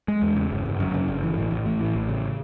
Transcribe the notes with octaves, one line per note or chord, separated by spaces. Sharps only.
G#3
E2
C#3
G1
G1
F#2
C#3
G1
E3
A1
A1
A2
E3
A1
C#3